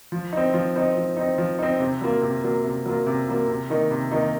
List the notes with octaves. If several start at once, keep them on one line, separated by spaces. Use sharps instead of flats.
F3
C4 D#4
F3
C4 D#4
F3
C4 D#4
F3
C4 D#4
C3
F#3 A#3 F4
C3
F#3 A#3 F4
C3
F#3 A#3 F4
C3
F#3 A#3 F4
C3
D#3 A#3 D#4
C3
D#3 A#3 D#4